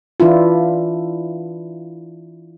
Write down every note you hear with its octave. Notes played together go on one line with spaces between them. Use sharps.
E3 D4 E4 F4